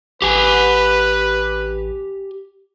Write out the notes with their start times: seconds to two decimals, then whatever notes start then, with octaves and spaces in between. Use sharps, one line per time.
0.22 A1 G4 B4 G#5